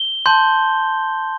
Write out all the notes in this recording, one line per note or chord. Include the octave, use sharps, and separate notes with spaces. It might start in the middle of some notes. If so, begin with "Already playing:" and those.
Already playing: G7
A5 C6 G6